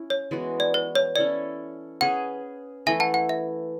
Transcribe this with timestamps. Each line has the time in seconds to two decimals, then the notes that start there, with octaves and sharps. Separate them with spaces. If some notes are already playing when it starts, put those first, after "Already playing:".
Already playing: C#4 E4
0.10 C#5
0.31 E3 G#3 B3 F#4
0.60 D5
0.74 B4
0.95 C#5
1.16 C#4 E4 A4 D5
2.01 C#4 G#4 B4 F#5
2.86 E3 A3 E4 E5 G#5
3.00 F#5 A5
3.14 F#5
3.29 E5